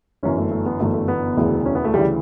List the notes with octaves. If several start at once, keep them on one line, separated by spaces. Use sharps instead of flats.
G1 F#2 E3 C#4
A3
A3
B3
G1 F#2 E3 A3
A3
B3
E1 D2 C#3 E3
C#4
B3
A3
D2 C#3 E3 G3